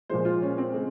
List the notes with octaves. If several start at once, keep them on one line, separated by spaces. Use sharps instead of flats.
A#2 F3 G#3 C5
F4
C#4
C4
C#3 G#3